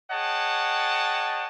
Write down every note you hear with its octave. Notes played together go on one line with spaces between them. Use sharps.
G#4 C#5 D#5 F#5 G5 A5